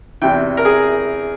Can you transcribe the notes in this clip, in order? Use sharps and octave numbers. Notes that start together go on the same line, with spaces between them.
E2 C3 E3 G5
A#4
G#4